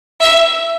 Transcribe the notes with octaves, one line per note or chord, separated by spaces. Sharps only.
E5